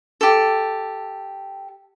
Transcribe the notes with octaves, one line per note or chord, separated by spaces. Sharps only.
G4 A4